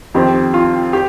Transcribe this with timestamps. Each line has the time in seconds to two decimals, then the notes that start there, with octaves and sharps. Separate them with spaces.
0.14 F2 D#3 C4 G4
0.54 F4
0.93 G4